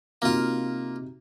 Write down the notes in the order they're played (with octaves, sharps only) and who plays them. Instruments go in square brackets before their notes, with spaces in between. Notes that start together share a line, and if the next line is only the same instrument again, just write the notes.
[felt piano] C3 D#4 F#4 [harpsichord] A#3 F4